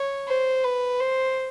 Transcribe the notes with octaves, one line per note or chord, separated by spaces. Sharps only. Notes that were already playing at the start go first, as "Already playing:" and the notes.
Already playing: C#5
C5
B4
C5